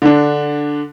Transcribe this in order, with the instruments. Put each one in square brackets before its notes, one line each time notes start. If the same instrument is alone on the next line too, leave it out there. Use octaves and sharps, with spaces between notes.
[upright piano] D3 D4